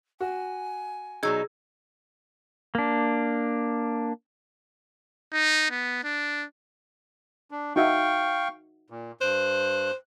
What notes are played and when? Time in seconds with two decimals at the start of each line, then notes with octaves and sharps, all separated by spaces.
0.20 F#4 G#5
1.23 B2 F#3 D#4 G#4 E6
2.75 A#3 D4
5.32 D#4
5.71 B3
6.04 D4
7.51 D4
7.76 D#4 F#4 E5 F5 G5 C#6
8.90 A#2
9.21 G2 C5 F#6